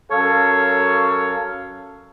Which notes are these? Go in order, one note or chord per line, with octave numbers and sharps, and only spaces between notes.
F#2 A4 C#5 F5